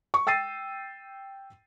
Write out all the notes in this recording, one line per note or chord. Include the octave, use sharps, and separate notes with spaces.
C#6
G5 E6 A6 C7 D#7